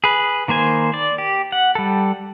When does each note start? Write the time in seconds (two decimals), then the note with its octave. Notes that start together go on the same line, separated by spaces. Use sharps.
0.04 G#4 B4
0.48 D#3 A#3 C5 G#5
0.94 D5
1.18 G4
1.52 F#5
1.75 G3 A4